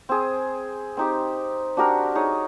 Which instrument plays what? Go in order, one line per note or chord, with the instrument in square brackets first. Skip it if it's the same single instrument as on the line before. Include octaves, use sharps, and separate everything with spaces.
[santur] C4 G#4
C4 D#4 G4
D4 F#4 G4 A#4
D#4 G#4 C#5